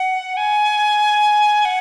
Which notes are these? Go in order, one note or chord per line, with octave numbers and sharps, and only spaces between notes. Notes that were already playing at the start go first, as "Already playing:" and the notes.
Already playing: F#5
G#5
F#5